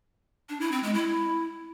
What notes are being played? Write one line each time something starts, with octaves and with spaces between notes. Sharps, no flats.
D4
E4
C4
G#3
E4